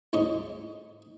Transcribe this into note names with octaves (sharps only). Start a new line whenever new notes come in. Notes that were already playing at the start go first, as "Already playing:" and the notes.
D2 G#2 C#4 D#5 C#6